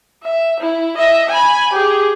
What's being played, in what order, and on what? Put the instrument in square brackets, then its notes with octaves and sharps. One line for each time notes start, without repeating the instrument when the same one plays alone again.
[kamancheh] E5
E4
D#5 E5
G#5 B5
G4 G#4